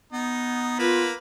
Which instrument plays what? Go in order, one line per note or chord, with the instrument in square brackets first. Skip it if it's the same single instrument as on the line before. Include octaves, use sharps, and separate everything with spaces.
[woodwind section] B3 [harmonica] D#4
[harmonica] A#3 [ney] F4 [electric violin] B4